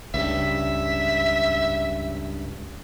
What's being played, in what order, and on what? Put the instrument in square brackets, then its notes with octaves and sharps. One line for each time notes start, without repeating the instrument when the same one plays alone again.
[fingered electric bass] C#2 G2 [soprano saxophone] E5